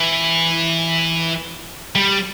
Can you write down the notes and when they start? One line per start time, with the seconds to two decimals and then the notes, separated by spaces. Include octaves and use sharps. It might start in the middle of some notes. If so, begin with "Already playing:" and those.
Already playing: E3
1.96 G3